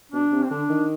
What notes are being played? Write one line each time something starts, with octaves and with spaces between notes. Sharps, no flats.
B2 D4
C3
C4
D3 D4
D#3